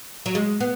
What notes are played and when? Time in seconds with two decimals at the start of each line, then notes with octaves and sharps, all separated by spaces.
0.26 F#3
0.35 G#3
0.61 B3